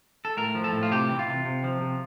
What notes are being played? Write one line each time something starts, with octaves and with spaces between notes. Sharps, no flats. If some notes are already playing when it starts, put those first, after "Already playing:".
A4
A2 A#4
F3
A4
A2
F4
C3 G4
E3
F4
C3
C3
F3
C3